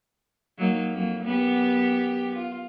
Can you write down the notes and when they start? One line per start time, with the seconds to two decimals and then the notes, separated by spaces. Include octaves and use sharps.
0.58 F#3 A#3 D#4
0.93 F2 F#3 A#3
1.23 F#2 B3 G4
2.35 F4